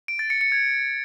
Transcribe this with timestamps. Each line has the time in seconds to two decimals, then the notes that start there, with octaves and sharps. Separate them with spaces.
0.08 D7
0.19 A6
0.30 C#7
0.41 C#7
0.52 G#6